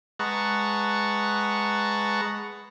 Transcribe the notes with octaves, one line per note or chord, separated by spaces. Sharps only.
G#3 B4 F#5 A5 A#5 C#6